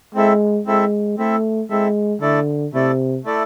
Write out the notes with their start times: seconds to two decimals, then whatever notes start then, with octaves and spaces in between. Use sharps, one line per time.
0.15 G#3 C4 E4 A4 E5
0.67 G#3 C4 E4 A4 E5
1.18 A3 C4 E4 A4 E5
1.70 G#3 C4 E4 A4 E5
2.21 D3 A3 E4 A4 D5
2.73 C3 A3 E4 A4 D5
3.24 A3 E4 A4 D5